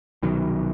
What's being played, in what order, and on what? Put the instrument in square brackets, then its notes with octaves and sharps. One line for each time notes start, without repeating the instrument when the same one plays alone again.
[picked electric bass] C2 B2 D#3 F#3